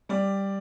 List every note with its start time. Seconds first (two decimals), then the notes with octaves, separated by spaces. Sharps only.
0.09 G3 D5